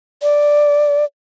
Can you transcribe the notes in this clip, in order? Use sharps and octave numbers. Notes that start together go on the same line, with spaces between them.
D5